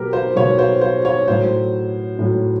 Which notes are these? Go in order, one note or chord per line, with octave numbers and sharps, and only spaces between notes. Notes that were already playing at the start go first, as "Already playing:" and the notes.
Already playing: B2 F#3 G4 A#4
C5
B2 F#3 C#5
C5
C5
C#5
A2 F#3 C5
A2 F#3